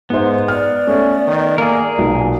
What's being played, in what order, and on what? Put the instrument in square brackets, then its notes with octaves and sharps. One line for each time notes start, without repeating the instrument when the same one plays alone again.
[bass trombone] G#2 [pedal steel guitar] B3 [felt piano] D#4 C5
[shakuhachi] D5 [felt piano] F6
[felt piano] A3 [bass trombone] C#4
[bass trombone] D#3
[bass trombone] A#3 [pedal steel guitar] G#4 A#4
[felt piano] B1 [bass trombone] A#2